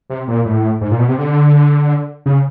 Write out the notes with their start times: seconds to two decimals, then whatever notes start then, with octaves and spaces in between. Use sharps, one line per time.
0.10 C3
0.28 A#2
0.45 A2
0.81 G#2
0.91 A#2
0.99 B2
1.09 C3
1.18 D3
2.26 C#3